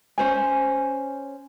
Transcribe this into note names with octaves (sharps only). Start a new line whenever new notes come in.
C#4 C5 G#5